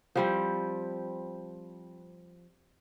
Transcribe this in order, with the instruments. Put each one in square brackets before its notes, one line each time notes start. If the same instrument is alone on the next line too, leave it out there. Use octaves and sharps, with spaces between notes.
[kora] F3 G3 C4